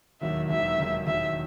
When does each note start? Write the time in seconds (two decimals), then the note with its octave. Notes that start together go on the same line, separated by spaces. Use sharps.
0.21 E1 D#2 D#3 F#3 E5
0.49 E1 D#2 D#3 F#3 E5
0.78 E1 D#2 D#3 F#3
1.06 E1 D#2 D#3 F#3 E5